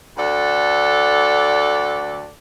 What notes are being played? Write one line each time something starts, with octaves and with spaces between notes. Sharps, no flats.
D2 A4 D5 F#5